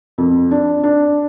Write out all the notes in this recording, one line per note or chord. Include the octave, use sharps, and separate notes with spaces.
F2
D4
D4